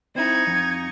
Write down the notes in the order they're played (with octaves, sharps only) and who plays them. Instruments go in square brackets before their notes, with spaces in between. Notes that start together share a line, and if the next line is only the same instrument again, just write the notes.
[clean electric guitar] C4 E4 [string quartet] D#4 C#6 [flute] G#6
[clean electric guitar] F2